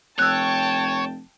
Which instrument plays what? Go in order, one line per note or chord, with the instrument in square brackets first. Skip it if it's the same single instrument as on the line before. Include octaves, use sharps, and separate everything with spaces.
[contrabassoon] F1 [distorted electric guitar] C#5 [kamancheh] G5 A5 [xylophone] E6 F#6